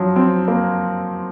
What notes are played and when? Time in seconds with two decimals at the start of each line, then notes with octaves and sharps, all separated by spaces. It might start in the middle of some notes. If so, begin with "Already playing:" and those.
Already playing: F3 F#3
0.16 C4
0.48 A#3